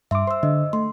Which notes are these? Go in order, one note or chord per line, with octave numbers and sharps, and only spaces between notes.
G2 E5 C6 D6
C5 C6 E6
D3 D#5
A3 C6